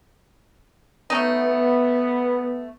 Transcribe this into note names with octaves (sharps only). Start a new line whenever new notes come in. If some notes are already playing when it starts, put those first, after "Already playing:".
A3 B3 C#4 D#4